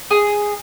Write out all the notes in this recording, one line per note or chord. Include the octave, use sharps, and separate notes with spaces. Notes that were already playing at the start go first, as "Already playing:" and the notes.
G#4